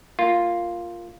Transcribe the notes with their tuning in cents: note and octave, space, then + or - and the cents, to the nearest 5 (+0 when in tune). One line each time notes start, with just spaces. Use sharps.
A#3 +0 F4 +0